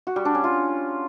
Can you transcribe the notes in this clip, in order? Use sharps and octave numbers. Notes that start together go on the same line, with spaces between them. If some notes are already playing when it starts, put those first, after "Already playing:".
F#4
G3
D4
C#4
F4